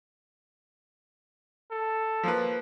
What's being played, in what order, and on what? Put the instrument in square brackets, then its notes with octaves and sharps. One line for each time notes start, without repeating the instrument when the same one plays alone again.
[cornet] A4
[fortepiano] F3 A#3 B4